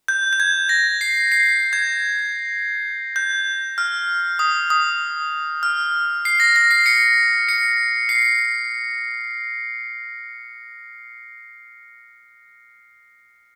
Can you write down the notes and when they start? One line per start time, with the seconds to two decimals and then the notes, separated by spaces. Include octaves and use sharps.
0.08 G6
0.33 G6
0.40 G#6
0.69 A#6
1.01 C7
1.32 C7
1.73 G#6
3.16 G6
3.78 F6
4.39 D#6
4.70 D#6
5.63 F6
6.25 C7
6.40 A#6
6.56 A#6
6.71 C7
6.86 C#7
7.49 C#7
8.09 C7